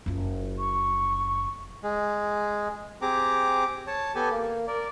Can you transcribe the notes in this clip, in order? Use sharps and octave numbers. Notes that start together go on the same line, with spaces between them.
F#1 F4
C#6
G#3
C4 G4 G#4 A#5 D6
C#5 A5
B3 G4 A4 G#5
A#3
A#4 D5